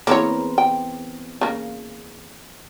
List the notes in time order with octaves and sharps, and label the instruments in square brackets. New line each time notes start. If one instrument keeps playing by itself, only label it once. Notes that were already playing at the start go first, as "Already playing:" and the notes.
[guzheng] E2 C4 A#4 [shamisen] A#3 E4 C#5
[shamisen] G5
C#3 A#3